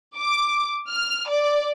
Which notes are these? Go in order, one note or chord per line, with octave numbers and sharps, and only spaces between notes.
D6
F6
D5